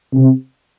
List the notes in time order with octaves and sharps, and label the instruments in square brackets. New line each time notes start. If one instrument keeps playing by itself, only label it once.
[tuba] C3